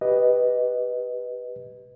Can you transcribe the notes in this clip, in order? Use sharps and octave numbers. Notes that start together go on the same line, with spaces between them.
G4 B4 D#5